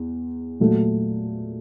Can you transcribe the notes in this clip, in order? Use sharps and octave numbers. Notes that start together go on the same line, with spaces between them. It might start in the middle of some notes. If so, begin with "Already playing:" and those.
Already playing: E2
A#2 F#3 A3